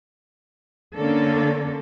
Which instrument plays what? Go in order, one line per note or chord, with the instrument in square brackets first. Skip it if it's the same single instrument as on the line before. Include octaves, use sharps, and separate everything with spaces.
[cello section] D3 A#3 C#4 D4 A4